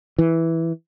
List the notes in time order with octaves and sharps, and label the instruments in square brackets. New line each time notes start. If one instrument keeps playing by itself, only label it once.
[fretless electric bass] E3